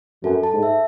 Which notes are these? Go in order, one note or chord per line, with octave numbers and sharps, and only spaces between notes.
F#2 A4
A5
G#2
E5